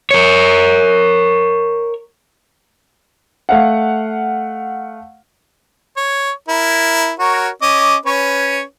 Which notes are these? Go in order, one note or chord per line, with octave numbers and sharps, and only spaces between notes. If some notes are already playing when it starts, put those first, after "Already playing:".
A#4 C#5
A3 F5 F#5
C#5
E4 A#4
F#4 A#4 C#5
C#4 D#5 D6
C#4 B4 C#5